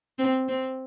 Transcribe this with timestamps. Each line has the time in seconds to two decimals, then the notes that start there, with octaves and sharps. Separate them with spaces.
0.19 C4
0.48 C4